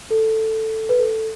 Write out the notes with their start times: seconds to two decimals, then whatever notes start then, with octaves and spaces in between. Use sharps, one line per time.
0.11 A4
0.89 B4
0.99 A4